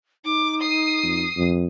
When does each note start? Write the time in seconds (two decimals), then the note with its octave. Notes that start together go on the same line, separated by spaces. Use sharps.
0.25 D#4 D6
0.61 D#6 C7
1.03 F2
1.37 F2